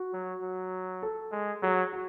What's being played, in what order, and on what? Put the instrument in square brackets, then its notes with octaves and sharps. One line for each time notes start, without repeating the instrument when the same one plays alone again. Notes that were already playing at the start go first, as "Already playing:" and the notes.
Already playing: [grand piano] F#4
[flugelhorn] F#3
F#3
[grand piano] A4
[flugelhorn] G#3
[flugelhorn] F#3 [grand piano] G#4
[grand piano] F#4